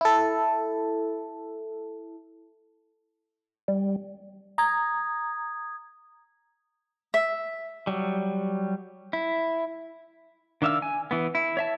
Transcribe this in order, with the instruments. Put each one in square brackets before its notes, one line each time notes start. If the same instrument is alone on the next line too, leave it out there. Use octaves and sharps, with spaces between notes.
[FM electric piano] E4 A4
[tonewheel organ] G3
[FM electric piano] A#5 [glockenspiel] D#6 G#6
[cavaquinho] E5
[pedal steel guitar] F#3 G3
E4
D#3 D4 E5 F5 E6
G#5
E3 B3
E4
C#5 E5 A5